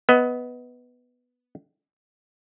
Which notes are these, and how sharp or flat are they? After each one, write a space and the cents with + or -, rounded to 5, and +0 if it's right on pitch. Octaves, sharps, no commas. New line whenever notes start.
B3 +0 D#5 +25